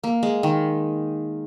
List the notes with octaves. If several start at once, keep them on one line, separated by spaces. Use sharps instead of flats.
A#3
G#3
D#3